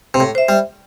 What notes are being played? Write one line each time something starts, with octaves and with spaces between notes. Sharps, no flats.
C3
A2
C5 E5
G3